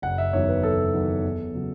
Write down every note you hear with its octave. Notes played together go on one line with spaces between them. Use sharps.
F#1 F#5
E5
E2 D#3 F#3 C#5
B4
F#1 A4
E2 D#3 F#3
E2
C#3 F#3